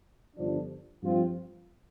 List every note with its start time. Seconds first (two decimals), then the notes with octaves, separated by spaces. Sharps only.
0.37 G1 G2 F3 D4
1.01 G2 F3 C4 F4